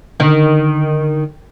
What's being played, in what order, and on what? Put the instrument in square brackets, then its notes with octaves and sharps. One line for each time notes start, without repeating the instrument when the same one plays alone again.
[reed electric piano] D3 [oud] D#3